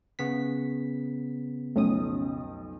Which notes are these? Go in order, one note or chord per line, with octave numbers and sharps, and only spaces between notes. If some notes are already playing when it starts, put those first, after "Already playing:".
C#3 B3 B6
B1 F2 A3 C#4 D#6